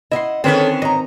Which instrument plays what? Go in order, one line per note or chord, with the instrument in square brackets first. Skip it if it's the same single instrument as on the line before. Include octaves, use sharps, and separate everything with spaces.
[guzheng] E4 C6 [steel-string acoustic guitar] D#5 E5 F#5
[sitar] D3 C#4 B4 [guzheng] D#3 C4 [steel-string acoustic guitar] G#4 A4
[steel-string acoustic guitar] G#2 A#5 [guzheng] D#5